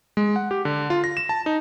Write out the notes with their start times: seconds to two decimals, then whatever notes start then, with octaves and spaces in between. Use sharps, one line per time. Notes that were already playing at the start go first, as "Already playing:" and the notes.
0.17 G#3
0.36 F#5
0.51 G4
0.65 D3
0.90 F4
1.04 A#6
1.17 E7
1.29 A5
1.46 D#4